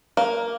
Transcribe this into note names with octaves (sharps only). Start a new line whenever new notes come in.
A#3